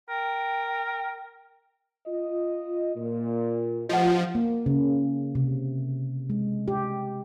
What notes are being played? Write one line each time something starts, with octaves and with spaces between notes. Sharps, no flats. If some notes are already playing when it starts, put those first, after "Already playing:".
A#4 G5
F4 D#5
A#2
A1 F3 D#5 F#5
A#3
C#3
C3
G#3
G4